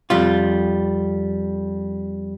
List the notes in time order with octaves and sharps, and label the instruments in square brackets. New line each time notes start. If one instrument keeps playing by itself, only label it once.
[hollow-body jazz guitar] F2 G3 F4